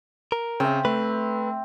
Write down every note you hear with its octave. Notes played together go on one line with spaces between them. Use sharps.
A#4
C#3 C4 E5
A3 B4